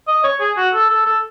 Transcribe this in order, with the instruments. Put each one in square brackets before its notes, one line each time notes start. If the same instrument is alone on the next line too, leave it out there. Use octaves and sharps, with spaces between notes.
[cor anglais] D#5
C#5
G#4
F#4
A4
A4
A4